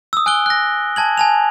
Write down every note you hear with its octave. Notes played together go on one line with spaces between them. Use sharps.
D#6 E6
G#5 F#6 D7 G7
F#6 A#6
G#5 A5 G#6 F#7
G#5 A5 F7